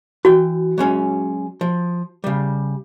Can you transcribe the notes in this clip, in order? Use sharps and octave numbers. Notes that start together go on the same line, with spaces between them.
E3 F#4 G5
F#3 G#3 C#4
F3
C#3 G3